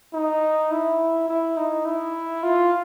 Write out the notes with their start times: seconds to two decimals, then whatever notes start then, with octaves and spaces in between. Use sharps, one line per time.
0.14 D#4
0.71 E4
1.28 E4
1.57 D#4
1.86 E4
2.43 F4